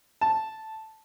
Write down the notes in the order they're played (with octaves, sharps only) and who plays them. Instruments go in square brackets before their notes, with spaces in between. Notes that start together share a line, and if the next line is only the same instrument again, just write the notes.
[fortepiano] A5